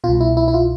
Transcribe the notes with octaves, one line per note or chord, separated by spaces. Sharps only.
C2 B2 F4
E4
E4
E4
F4